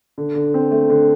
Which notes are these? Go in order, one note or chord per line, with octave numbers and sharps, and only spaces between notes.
D3
D3
C4
A3
D3